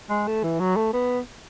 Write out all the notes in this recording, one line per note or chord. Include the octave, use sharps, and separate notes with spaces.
G#3
A3
E3
F#3
A3
B3